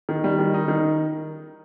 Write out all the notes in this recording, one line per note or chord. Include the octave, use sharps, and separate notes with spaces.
D#3
G3
D#3
D#4
D#3